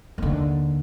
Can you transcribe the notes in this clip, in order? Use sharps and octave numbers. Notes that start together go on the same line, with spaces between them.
D#2 D3